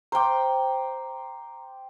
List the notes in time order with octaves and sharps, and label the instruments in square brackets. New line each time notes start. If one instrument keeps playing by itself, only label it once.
[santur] C5 G5 [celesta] A#5 D6